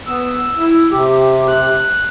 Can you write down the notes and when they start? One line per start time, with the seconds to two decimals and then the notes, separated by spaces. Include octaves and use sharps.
0.06 B3 E6
0.55 E4
0.91 C3 G4
1.48 F#6